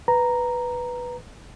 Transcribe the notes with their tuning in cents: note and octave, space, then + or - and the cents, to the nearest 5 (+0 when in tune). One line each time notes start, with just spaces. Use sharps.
B4 +0 A#5 +0